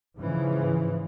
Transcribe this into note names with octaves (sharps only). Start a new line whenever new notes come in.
G#2 C#3 E3 F3